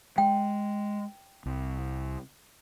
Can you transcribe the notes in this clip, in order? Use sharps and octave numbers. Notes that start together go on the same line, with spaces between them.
G#3 G5
C2